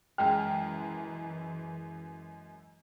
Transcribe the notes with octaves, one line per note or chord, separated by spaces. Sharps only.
F#2 E3 G#3 G5 F6